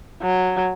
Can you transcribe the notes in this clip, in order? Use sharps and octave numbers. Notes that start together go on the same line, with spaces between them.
F#3